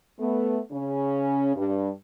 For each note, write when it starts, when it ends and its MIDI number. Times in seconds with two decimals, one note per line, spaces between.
0.20 0.59 57
0.20 0.59 59
0.72 1.54 49
0.72 1.54 61
1.55 1.89 43